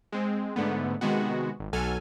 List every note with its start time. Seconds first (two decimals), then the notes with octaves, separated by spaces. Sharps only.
0.12 G#3 C4
0.56 G#2 D3 A3 B3
1.01 C3 D#3 G#3 B3 F#4
1.60 G#1
1.73 B1 F#3 A4 G#5 F6